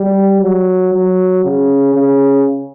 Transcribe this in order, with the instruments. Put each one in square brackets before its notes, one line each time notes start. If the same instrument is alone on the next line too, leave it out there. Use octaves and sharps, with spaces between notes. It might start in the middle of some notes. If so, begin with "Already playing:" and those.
Already playing: [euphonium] G3
F#3
F#3
C#3
C#3